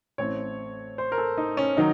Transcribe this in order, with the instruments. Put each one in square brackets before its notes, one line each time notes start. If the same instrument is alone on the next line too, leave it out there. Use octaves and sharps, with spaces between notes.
[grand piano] A1 A2 A3 C4 C#5
C5
A#4
A4
D#4
C#4
D#3 F#3 D#4